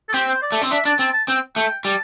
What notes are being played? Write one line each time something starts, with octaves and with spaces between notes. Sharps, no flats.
A4
C4 G4
C5
D5
A3
C4
D4 E5
D4 A5
C4 A5
A5
C4 G5
A3 G5
G3 A5